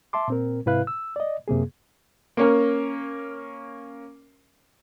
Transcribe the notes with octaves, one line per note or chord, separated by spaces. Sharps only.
E5 A5 C6 D6
A#2 C4 A#4
G#2 C3 E4 B4 F5 F#6
E6
D5 D#5
F#2 C3 A#3 G#4
A#3 C#4 A#4